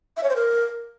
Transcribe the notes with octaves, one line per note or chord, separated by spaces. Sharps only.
E5
C#5
C5
A#4